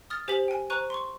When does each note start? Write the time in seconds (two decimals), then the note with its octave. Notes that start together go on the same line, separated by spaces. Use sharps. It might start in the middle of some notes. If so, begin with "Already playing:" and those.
0.10 D#6 F6 A6
0.28 G4 C5 G#5 B6 F#7
0.48 G5 G#5
0.70 C5 A#5 C#6 F#6 D#7
0.90 C6 C#6